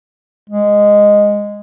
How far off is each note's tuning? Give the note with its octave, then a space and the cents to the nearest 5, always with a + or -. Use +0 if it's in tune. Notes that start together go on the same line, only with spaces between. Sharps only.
G#3 -10